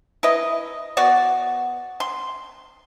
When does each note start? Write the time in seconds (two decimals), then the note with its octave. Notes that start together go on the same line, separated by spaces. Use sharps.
0.23 E4 B4 D#5
0.97 B3 F#4 D5
2.00 C6